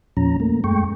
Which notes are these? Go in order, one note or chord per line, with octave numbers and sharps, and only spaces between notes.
E2 A#2 F3 C#4 A#5
A3 A#3
F#2 G#3 A3 G5 C#6